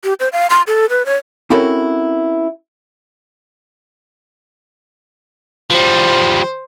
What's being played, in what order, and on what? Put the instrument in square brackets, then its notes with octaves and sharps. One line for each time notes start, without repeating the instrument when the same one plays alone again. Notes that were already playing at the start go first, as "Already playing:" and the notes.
[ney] G4
C5
F5
C6
A4
B4
C#5
[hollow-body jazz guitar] C4 C#4 E4 F#4 A4 A#4
[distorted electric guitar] F3 G3 [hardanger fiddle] C5